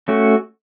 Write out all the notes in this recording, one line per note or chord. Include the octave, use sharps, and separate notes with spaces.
A3 C#4 F#4